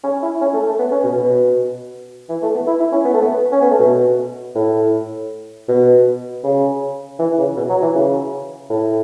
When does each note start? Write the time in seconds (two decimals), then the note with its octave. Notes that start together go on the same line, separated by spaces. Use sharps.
0.04 C#4
0.22 E4
0.41 C#4
0.54 A3
0.66 A3
0.79 B3
0.92 C#4
1.04 B2
1.17 B2
2.29 E3
2.43 A3
2.55 B3
2.67 E4
2.80 E4
2.92 C#4
3.05 B3
3.14 A3
3.22 B3
3.52 C#4
3.61 B3
3.71 A3
3.80 B2
4.56 A2
5.69 B2
6.44 C#3
7.19 E3
7.38 C#3
7.56 B2
7.70 F#3
7.82 E3
7.94 C#3
8.70 A2